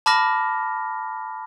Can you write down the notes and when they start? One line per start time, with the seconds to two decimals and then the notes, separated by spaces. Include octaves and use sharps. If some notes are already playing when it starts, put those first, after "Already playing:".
0.06 A5 B5 D6 F6 A#6